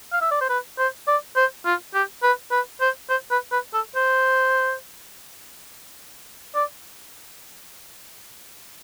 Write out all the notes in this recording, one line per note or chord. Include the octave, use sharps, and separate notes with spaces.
F5
E5
D5
C5
B4
C5
D5
C5
F4
G4
B4
B4
C5
C5
B4
B4
A4
C5
D5